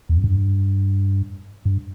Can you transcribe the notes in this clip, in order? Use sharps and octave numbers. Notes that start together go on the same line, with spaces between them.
E2
F#2
G2
G2